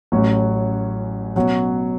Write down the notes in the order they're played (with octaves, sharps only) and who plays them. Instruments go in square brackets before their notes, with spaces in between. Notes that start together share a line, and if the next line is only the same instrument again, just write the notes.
[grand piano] A1 A2 F#3 C#4 F#4
B2 F#3 C#4 F#4